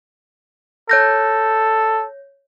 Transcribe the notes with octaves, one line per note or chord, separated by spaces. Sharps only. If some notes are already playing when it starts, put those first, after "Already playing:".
A4 C#5 G6 A#6